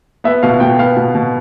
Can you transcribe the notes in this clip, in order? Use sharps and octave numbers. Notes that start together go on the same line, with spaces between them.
B3 E5
B2 F5
B2 G5
B3 F5
B2
B2